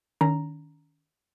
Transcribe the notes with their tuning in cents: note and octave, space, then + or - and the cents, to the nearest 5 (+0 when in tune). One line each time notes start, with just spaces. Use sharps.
D#3 -10 C#4 +35 A#5 +0